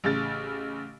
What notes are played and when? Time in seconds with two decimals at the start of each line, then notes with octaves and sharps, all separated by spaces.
0.04 A1 C#3 A6